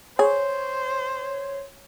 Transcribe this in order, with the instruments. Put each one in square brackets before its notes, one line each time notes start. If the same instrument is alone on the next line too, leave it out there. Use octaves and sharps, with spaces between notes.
[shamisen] G#4 [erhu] C5 [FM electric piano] C#5